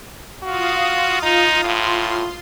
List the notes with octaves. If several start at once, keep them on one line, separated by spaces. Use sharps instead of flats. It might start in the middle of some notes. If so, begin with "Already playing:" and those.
F4 F#4 F5 D#6
D#4
A2 F4 C6